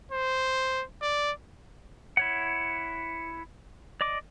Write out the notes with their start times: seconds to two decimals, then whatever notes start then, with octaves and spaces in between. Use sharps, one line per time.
0.12 C5
1.02 D5
2.17 E4 C#5 F#5
4.01 D5 D#5 D6